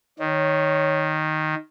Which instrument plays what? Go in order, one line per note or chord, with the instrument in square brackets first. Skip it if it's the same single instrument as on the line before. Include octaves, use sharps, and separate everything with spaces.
[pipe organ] D#3 [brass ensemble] C#5